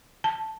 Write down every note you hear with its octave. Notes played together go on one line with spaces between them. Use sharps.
A5